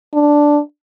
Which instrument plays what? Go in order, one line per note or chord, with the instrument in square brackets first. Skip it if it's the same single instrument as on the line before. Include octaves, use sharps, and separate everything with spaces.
[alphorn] D4